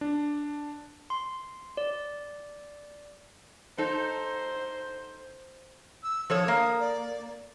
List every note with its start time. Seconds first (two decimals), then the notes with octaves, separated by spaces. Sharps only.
0.01 D4
1.10 C6
1.77 D5
3.78 D#4 A4 C5
6.03 E6
6.30 F3 A4 C#5 D#6
6.48 A#3
6.80 D5